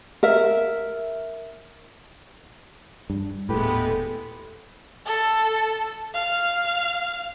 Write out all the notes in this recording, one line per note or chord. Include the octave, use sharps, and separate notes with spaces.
A#4 E5
G2
D#1 A2 G#3 A3 B3 G4 A4 B4
A4
F5